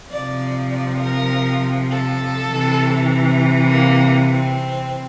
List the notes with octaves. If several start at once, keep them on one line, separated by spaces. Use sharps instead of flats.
C3 F3 D5
D5
A#4
A4
C3 E3
A#3
C4